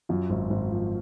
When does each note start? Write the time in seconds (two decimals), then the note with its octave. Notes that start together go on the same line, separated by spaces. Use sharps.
0.09 F#2 F4
0.30 G#1
0.50 G#1
0.71 F3